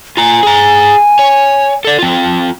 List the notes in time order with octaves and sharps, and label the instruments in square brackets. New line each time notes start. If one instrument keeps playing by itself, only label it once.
[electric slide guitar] F4 A#5 [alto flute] G#5
[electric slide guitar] G#4 A#5
C#5
A4 D5
C4 F4